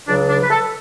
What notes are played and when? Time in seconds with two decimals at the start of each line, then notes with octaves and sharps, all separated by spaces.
0.07 C#2 C#3 F#3 D4
0.29 D4
0.42 B4
0.50 A4